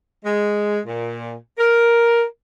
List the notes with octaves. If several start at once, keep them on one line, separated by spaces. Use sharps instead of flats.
G#3
A#2
A#4